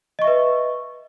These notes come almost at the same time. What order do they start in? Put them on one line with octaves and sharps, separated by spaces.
D#5 C#6 E5 B4